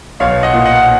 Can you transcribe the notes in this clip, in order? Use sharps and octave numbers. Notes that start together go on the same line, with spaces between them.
B1 C#5 F5
D#5 F#5
A#2
D#5 F#5